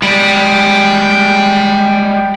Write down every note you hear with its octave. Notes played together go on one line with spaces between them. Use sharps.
G3 G#3 G5 B5